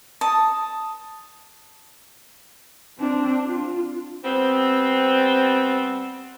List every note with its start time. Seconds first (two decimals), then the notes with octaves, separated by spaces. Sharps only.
0.21 A5 D#6
2.99 C4 D4
3.46 F4
4.23 G3 B3 C4